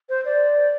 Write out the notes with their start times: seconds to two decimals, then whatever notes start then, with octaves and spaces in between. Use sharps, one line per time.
0.09 C5
0.25 D5